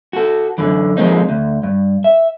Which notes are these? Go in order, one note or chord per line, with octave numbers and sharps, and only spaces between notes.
F#4 A4
F#2 B2 D3 E3
F3 G#3 A#3 C4 D#4
D2
G2
E5